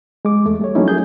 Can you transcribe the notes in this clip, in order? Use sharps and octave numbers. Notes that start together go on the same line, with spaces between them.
G#3 D6
E2 A3
G3 A3 C#5
F#3 A3 A#3 C#4 D#4 E4
G#4 A#4 G6